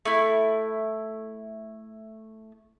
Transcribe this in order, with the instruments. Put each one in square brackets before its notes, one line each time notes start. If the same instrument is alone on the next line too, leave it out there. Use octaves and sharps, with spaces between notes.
[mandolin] A3 E4